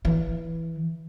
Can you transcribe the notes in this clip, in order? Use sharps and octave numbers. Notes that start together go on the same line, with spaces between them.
E3